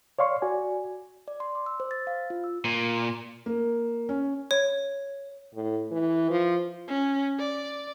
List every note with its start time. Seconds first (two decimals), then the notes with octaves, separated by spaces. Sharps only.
0.19 C#5 D5 F5 C6 C#6
0.42 F#4 D5 G#5
1.28 D5
1.40 C6
1.55 D6
1.66 E6
1.80 C5
1.91 A6
2.07 F5
2.30 F4
2.44 E6
2.65 A#2
3.46 A#3
4.09 C#4
4.51 C#5
5.55 A2
5.91 E3
6.30 F3
6.88 C#4
7.39 D5